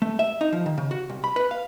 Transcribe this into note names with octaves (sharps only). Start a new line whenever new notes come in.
A3
E5
D#4
F3
D#3
C#3
F#4
C2
B5
B4
F5